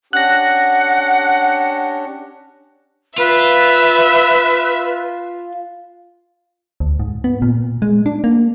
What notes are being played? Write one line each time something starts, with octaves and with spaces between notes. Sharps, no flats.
C#4 D4 G4 F#5 F#6 A#6
F4 B4 E5
D2
G#2
B3
A#2
G#3
D4
A#3